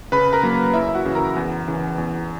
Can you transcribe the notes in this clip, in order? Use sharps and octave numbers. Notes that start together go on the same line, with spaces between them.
C#3 B4 B5
A#4 A#5
F#3 A#3
F#2 E4 E5
E5
F#4 F#5
C#3 E3
A#4 A#5
E2
C#3 E3
E2